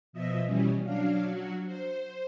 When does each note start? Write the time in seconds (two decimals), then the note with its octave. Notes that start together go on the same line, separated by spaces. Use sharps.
0.13 B2 F3 D#5 E5
0.44 B2 E3 G3 C#4
0.83 F#3 D4 F5
1.24 F#3 F#4
1.65 C5